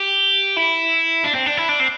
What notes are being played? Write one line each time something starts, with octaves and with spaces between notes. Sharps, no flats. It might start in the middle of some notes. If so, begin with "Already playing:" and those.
Already playing: G4
E4
D4
C4
D4
E4
D4
C4